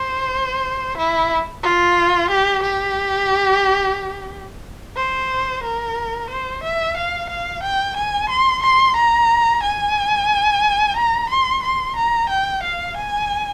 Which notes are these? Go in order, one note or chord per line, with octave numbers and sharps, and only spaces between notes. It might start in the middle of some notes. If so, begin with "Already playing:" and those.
Already playing: C5
E4
F4
G4
G4
C5
A#4
C5
E5
F5
F5
G5
G#5
C6
C6
A#5
G#5
A#5
C6
C6
A#5
G5
F5
G#5